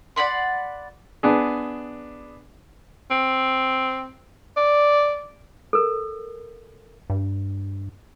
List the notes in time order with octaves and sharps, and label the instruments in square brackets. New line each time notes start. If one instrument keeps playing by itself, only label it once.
[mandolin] D5 F#5 B5 C6
[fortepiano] B3 D4 G#4
[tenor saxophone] C4
D5
[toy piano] A4 A#4
[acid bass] G2